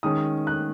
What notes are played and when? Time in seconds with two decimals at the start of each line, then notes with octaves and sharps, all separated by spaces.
0.03 D#3 G#3 C#4 D#6
0.47 F#6